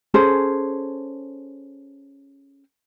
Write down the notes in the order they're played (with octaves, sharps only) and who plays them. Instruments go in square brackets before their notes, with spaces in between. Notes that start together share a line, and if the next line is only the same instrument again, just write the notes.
[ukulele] C#4 G#4 A4 C5